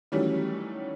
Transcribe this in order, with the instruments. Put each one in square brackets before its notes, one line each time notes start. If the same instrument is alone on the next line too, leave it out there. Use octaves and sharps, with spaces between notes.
[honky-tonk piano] D#3 E3 F#3 G3 A3 C#4